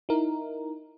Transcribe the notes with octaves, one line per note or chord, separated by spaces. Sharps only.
D#4 E4 A#4